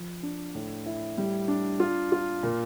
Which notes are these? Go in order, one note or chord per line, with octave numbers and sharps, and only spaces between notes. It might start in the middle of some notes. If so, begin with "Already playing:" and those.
Already playing: F3
D4
A2
E4
G3
D4
F4
F4
A#2